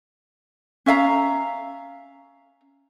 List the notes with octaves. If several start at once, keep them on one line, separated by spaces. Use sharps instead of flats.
C#4 E5 F5 A#5